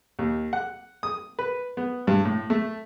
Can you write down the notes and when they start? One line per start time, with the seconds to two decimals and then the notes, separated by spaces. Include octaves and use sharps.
0.19 D#2
0.53 F#5
1.03 D#6
1.39 B4
1.77 B3
2.07 G2
2.25 A2
2.50 A3